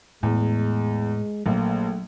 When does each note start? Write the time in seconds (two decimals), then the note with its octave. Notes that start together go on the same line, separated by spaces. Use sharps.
0.23 E2 A2 G#3
1.46 A#1 F#3 A3 A#3